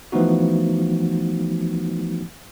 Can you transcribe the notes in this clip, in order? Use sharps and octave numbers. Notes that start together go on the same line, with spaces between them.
E3 F3 A3 B3 D#4 F#4